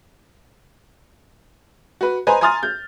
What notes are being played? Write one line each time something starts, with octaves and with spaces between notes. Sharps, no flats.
F#4 B4
B4 C5 D#5 G#5 A#5 C6
G#5 A#5 C6 D#6 F6 A6
G6